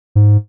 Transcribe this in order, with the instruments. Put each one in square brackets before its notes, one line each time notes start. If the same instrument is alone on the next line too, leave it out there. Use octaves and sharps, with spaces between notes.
[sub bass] G#2